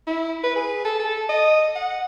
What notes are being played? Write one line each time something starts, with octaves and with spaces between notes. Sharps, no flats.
E4
B4
G#4
A4
A4
D#5
F#5